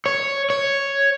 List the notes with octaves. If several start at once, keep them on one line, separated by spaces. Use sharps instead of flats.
C#5
C#5